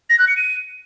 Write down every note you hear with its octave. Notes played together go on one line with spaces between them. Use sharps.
A#6
F#6
C#7
D#7